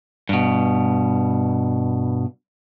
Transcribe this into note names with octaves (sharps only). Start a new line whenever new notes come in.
G2 B2